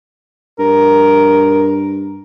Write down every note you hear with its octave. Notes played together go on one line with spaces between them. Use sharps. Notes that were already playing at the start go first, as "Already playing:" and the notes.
G2 A#4